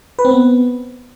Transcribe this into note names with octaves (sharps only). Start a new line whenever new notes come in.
B4
C4
B3